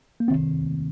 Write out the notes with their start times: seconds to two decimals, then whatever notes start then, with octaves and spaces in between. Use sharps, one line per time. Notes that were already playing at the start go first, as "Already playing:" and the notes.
0.20 A#3
0.28 C3 D#3 C4